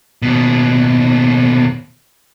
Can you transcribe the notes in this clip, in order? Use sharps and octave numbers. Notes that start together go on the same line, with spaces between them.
D#2 B2